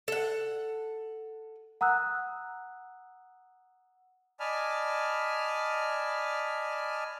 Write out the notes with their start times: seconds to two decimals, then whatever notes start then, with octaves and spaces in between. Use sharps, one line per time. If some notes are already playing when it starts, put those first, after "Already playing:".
0.08 A4 F#5
1.81 F#5 A#5 D#6 E6 F#6
4.40 D5 D#5 G#5 A5 B5 F6